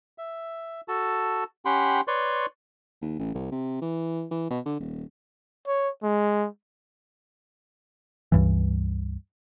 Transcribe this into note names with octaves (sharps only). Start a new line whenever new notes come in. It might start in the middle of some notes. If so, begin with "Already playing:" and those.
E5
F#4 A4 A5
C#4 G4 F#5 G5 B5 C6
B4 C#5 D5 C6 C#6
D#2
A1
C2
C3
E3
E3
B2
D3
D#1
C#5
G#3
C#2 G2 E3